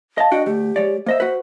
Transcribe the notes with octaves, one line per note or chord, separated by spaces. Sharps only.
D#5 F5 A5
D4 F#4 D#5 G5
D2 A3 G4
G#3 C#5 D5
A#3 C5 D#5 E5
F#4 B4